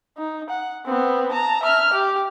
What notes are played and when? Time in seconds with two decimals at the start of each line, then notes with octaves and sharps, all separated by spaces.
0.18 D#4
0.50 F#5
0.86 B3 C4
1.31 A5 A#5
1.63 E5 F6
1.93 G4